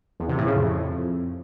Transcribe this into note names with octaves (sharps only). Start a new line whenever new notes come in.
E2
C3
A2
C#3
F2